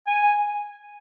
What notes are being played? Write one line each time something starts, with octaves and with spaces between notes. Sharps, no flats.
G#5